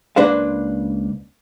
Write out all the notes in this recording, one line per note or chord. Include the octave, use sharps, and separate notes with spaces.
C#2 A#3 D4 B4 C5 F5